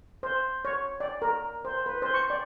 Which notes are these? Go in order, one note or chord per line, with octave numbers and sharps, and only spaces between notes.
C5
C#5
D5
A#4
C5
B4
C5
C#6
D5